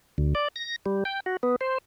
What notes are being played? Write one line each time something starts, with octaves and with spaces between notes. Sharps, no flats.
D2
D5
A#6
G3
G5
F#4
B3
C5